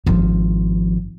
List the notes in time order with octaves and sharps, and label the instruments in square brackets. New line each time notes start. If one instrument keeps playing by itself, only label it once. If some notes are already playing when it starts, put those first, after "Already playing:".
[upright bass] G#1 F3